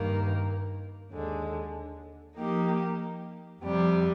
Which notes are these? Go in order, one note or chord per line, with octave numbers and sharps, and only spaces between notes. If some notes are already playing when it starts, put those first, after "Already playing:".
Already playing: G2 D#3 A#3
D#2 D3 G#3
F3 A#3 D#4 G4
F2 C3 G3